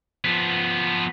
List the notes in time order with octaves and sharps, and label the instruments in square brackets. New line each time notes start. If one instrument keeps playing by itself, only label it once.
[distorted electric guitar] F3 B3